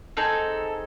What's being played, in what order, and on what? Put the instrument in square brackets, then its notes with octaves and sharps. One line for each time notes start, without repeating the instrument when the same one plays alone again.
[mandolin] C4 D#4 G#4 A4